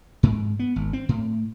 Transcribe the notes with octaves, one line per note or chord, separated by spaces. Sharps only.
G#2
B3
G#1
C4
A2